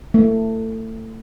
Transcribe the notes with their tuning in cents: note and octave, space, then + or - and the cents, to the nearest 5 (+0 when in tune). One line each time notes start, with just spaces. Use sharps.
A3 +25